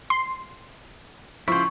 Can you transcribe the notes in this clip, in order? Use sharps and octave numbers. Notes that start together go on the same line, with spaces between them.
C6
C#2 F3 E4 C5 C#6